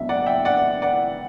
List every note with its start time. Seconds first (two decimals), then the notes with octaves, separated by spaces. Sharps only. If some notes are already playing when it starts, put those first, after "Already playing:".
Already playing: C#2 B2 F#3 B3 D4 E5
0.09 D5 F#5
0.26 E5 G5
0.45 D5 F#5
0.82 D5 F#5